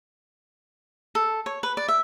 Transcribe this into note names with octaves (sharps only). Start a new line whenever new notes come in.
A4
C#5
B4
D5
E5